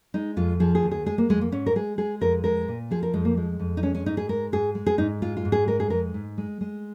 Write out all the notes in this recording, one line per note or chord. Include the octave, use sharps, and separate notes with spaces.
G#3 D#4
F2 F4
F3 G#4
G#4
D#2
G#4
G#3 G#4
A#3
F2 G#3
A#3
G#2 C#4
A#4
G#3 G#4
G#3 G#4
F2 A#4
G#3 A#4
A#2
F3 G#4
A#4
F2 G#3
A#3
G#3
F2
D#4
G#3 C#4
C#4
G#2 D#4
G#4
G#3 A#4
G#2 G#4
G#3
G#4
G#2 D#4
G#3 F4
F4
G#2
G#4
G#3 A#4
G#4
F2 A#4
G#2
G#3
G#3